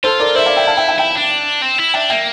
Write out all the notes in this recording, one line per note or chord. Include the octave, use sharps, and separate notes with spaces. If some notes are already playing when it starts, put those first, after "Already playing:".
F4 A4 C5
A#4 D5
E4 C5 E5
D5 F5
E5 G5
F5 A5
E5 G5
E5 G5
E4 E5 G5
D4
C4
E4
D4 E5 G5
A#3 E5 G5